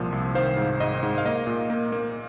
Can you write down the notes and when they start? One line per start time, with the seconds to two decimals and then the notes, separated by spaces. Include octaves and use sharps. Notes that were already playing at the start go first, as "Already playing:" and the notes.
Already playing: C2 A#2 F3
0.12 C2
0.35 D#3 C5 F5
0.57 G#2
0.80 G#2 D#5
1.03 G#2
1.18 F5
1.26 A#3 D#5
1.47 A#2
1.70 A#3
1.92 A#3